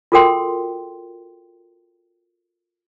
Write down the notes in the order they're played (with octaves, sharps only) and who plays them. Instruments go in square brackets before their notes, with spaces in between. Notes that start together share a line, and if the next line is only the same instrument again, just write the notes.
[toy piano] F4 F#4 A4 A#4 G5 C6